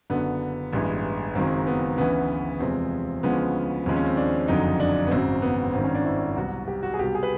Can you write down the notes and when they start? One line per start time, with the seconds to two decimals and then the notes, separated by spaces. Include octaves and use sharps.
0.10 F#1 F#2 D3 B3
0.73 A1 G2 E3 G#3
1.35 F#1 F#2 D#3 G#3 C4
1.67 B3
1.97 D2 C#3 E3 B3
2.60 E2 C3 F3 G#3 C4
3.23 D2 C#3 F3 G#3 B3
3.86 D#2 C#3 F3 G#3 C4
3.96 C#4
4.06 C4
4.17 D4
4.48 F#1 F2 D3 F#3 D#4
4.80 D4
5.07 B3
5.11 G#1 F#2 C#3 C4
5.42 B3
5.74 G#1 G2 D#3 C4
5.84 C#4
5.95 D4
6.05 E4
6.36 C2 B2 F#3 F#4
6.68 G4
6.83 F#4
6.94 G#4
6.99 C2 B2 F#3 G4
7.15 G#4
7.23 B4